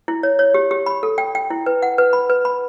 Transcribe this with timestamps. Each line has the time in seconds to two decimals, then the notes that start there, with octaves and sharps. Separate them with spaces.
0.08 E4
0.23 C#5
0.39 C#5
0.54 G4
0.71 G4
0.86 B5
1.03 A4
1.18 G5
1.35 G5
1.50 E4
1.66 B4
1.82 F#5
1.98 B4
2.13 B5
2.30 B4
2.45 B5